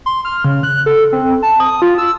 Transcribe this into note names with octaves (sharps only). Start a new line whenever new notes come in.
C6
F6
C#3
F#6
A4
C4
A5
D#6
F4
E6